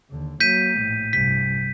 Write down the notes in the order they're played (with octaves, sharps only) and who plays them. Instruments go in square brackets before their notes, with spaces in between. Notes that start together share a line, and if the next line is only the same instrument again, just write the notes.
[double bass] D#2 D3
[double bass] F#3 A#3 [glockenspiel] G6 B6 D#7
[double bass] A#1 A2
[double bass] C2 G2 [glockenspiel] B6